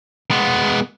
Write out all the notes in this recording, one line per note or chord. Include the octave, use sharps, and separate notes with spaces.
G#3 B3